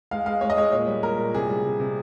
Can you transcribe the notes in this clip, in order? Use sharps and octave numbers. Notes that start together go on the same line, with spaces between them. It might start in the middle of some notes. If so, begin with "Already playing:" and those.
G#3 F5
G#3 F5
G#3 C#5
D#5
G#3 C#5
A#2 C#5
G3
A#2 A#4
A#2
C3 G#4
G3
C3
C3